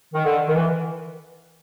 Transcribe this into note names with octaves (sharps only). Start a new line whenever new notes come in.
D#3
D3
D#3
E3